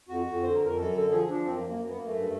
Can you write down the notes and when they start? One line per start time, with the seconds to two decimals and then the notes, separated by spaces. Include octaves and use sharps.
0.09 F2 F#4
0.26 F2
0.43 D3 C5
0.55 A#4
0.60 F2
0.65 A#4
0.77 F#2 A4
0.94 D3
1.11 F3 G#4
1.28 F3 D4
1.46 F#2 C4
1.57 A#3
1.63 F#2
1.69 A#3
1.80 F#2
1.88 B3
1.97 F#2 A#3
2.06 A3
2.15 G2